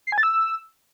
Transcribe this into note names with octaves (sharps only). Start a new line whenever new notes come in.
C7
G#5
A6
E6